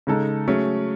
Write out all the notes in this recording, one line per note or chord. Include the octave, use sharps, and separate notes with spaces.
C#3 G#3 D#4 A4
F#3 A3 C#4 G#4